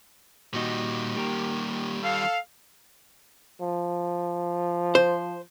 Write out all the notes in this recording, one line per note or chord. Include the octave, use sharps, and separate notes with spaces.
A#2 D#3 G3 F#4 D#5
A#3 G4 A#4
A4 F5
F3
C5